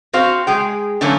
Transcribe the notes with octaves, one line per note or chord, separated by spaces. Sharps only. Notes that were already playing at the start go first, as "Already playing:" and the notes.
C4 F#4 C5 F5
G#3 G#4 G5
D3 E3 F#3 A3 A#3 C#4